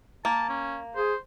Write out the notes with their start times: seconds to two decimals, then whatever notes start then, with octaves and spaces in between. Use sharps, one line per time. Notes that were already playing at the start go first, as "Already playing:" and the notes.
0.25 A#3 A5
0.49 C#4
0.96 G#4 C5